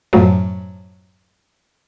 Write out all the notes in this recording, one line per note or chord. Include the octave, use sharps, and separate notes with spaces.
F#2 A2 F3 F#3